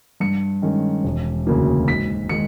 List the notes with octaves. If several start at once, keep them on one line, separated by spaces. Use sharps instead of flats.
G2 C#7
D#3 G#3 C#4
E1
D2 C#3 F#3 A#3
G#2 B6
D#3 G#3 C#7